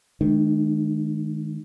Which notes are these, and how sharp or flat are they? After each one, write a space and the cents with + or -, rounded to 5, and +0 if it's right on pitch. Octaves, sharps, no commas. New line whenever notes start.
D#3 +0 G#3 +40 D4 +45